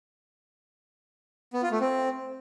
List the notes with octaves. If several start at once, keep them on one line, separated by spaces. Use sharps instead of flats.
B3
F4
A3
C4